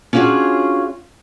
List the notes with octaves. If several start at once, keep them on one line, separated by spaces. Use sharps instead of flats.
C#4 D4 F4 F#4 G#4 C#5